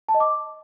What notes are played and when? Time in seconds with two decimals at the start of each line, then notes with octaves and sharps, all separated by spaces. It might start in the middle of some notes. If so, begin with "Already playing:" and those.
0.09 A5
0.14 D#5
0.20 D6